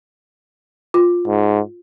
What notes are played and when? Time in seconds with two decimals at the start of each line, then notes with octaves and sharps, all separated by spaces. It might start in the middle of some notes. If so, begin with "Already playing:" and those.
0.94 F4
1.27 G#2